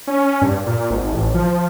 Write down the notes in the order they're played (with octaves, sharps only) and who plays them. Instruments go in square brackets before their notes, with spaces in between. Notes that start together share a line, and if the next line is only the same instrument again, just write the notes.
[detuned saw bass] C#4
G2
A#2
G#1
A1
F3